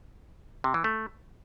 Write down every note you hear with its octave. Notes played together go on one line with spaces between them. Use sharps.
C3
E3
A3